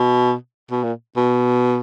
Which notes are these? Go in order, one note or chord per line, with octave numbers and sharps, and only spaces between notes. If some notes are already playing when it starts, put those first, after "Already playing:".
Already playing: B2
B2
A#2
B2